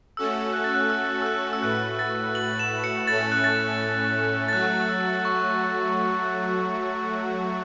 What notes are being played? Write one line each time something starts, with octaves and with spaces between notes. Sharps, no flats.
A3 C#4 F#4 A4 E6
F#6
A6
F#6
E6
E6
F#6
E6
A2 A3 F#4 B4 F#6
A6
F#7
E7
C#7
A2 A3 C#4 A4 A6
F#6
A6
A6
F#3 A3 F#4 F#6
E6
C#6